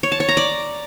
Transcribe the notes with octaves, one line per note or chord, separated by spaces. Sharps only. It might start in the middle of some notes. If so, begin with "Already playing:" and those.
C#5
A5
C#5
A#5
D5